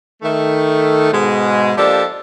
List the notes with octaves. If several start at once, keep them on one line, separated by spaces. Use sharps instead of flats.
D#3 A3
G#2 B2 G#3
F3 A#3 D4 G4 A4